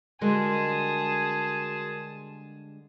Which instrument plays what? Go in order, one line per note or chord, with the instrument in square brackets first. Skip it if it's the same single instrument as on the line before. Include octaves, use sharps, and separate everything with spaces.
[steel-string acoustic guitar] D3 G3 G#3 [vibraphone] F#4 A#4 C6 [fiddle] G#4 A5